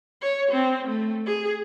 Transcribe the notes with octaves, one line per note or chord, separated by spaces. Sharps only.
C#5
C4
A3
G#4